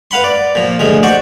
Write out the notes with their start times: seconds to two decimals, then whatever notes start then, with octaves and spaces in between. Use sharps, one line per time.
0.11 B4 F5 F#5 B5 C6
0.24 D5
0.55 A#2 F3
0.79 D2 A#2 F3 G#3
1.03 F#4 C5 D5 F#5